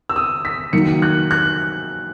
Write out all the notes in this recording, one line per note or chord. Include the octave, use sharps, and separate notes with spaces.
E6
D#6
B6
D#3 F#3 A#3 C#7
F#6
F#6